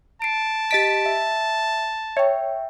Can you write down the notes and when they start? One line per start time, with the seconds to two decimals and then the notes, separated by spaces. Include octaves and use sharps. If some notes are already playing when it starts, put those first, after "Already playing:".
0.22 A5 C7 D7
0.71 G4 D#5 A6 B6 D7
1.06 E5
2.17 C#5 E5 G5